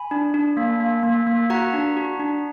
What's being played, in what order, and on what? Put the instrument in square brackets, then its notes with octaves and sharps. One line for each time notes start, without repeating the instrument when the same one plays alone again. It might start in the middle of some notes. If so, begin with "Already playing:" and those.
Already playing: [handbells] G#5 B5
D4
D4
A#3
A#3
A#3
A#3
F#4 F#5 A#5
D4
F#4
D4